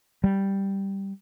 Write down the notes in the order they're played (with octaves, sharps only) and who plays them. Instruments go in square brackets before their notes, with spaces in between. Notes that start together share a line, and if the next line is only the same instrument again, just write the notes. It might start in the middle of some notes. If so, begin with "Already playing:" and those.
[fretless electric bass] G3